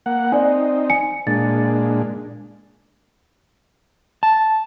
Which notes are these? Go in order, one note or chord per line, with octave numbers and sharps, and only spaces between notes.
A#3 F#5
C4 D#4 D5 G#5
G#5 C#7
A#2 G#3 D4 A6
A5